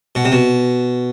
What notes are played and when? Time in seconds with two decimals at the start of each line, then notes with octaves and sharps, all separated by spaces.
0.15 B2
0.25 C3
0.32 B2